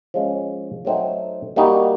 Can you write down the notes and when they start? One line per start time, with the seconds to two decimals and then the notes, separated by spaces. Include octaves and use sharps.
0.14 F3 G#3 C#4
0.85 F#3 A3 C4 D#4
1.56 G3 A#3 D#4 F#4